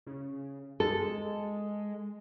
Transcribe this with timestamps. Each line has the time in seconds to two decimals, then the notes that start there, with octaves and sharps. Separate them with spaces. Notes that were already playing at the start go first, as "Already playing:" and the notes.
0.06 C#3
0.80 G#3 A4